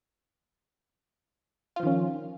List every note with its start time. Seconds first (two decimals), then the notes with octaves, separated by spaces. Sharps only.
1.76 F4
1.80 F3
1.83 D#3
1.87 C#4